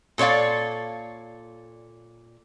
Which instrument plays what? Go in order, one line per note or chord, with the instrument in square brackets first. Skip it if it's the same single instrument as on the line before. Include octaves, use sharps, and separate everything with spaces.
[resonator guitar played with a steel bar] A#2 A4 C#5 D5 F5